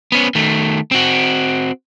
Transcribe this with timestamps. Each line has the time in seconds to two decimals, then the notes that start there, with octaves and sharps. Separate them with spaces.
0.12 B3 C#4
0.35 D#3 A3
0.92 C4 F#4